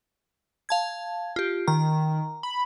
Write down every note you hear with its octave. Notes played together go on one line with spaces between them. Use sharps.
F5 A5 G#6
F4 G4
D#3 A#5
B5